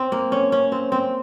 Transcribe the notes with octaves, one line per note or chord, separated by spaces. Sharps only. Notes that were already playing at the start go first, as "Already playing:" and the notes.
Already playing: C4
A#3
C#4
C#4
C4
C4